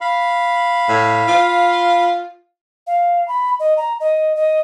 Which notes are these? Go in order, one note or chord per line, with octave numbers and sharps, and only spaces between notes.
F5 B5
A2
F4
F5
B5
D#5
A#5
D#5
D#5